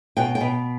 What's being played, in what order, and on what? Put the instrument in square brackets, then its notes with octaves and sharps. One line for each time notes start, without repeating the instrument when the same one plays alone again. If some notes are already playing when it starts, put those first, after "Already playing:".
[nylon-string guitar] B2 G5
G5
B2